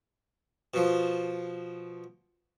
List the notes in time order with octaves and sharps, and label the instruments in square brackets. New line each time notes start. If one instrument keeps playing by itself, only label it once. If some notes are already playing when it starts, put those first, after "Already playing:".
[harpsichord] B2 F3